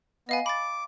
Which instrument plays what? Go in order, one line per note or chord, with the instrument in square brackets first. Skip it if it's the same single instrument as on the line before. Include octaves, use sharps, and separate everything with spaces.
[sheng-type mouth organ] B3 [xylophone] D#5 F5 G#5
[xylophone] B5 A6 [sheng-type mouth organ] D6